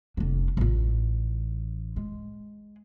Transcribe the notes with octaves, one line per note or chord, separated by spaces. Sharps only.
F1 D4
A1 F4
G#3